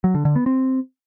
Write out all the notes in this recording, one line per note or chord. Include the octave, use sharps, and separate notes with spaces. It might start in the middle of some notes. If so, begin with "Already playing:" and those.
F#3
D3
D3
B3
C4